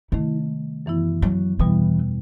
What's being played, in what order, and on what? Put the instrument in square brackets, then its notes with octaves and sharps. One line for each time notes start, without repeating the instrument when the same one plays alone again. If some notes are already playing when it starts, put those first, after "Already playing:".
[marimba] C3 D#3 A3 [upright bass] E4
[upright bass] G3
[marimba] F#2 E3 B3 E4
[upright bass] F#3
[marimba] E2 B2 G3 B3 [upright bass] E3